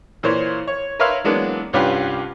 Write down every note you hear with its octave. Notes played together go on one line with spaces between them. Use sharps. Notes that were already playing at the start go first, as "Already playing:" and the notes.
A#2 E3 A#3 C5 C#5
C#5
A#4 B4 C#5 E5 F5 C6
E3 F#3 G#3 A#3 B3 D4
C2 G2 C#4 F4 G4 B4